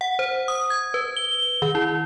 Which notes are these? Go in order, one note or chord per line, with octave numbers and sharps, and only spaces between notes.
F#5
C5
D#6
G#6
B4
G7
D#3
E4